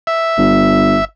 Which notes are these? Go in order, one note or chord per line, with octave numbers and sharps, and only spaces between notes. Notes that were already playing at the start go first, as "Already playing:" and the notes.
E5
G1